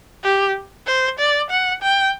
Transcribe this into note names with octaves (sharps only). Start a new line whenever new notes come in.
G4
C5
D5
F#5
G5